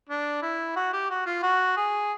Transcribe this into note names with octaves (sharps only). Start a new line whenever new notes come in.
D4
E4
F#4
G4
F#4
F4
F#4
G#4